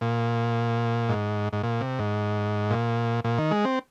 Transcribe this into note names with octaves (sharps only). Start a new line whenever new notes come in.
A#2
G#2
G#2
A#2
C3
G#2
A#2
A#2
D#3
G#3
C4